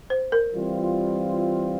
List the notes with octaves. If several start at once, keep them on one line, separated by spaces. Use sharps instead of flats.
C5
A#4
E3 G3 C4 F4